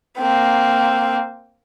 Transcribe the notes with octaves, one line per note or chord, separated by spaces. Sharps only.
A#3 C4